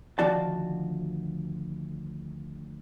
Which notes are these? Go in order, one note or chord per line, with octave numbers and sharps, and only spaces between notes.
D2 D#3 F3 F#4 D5 A5